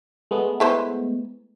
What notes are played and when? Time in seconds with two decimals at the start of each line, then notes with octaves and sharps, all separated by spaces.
0.31 G#3 A3 B3
0.60 E4 B4 C5